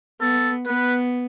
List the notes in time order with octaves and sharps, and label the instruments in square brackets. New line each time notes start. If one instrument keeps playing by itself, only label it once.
[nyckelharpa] B3 [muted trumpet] A4
[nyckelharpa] B3 [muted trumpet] B4